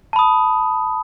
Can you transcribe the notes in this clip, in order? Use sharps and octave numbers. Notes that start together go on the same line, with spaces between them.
A5 B5 D#6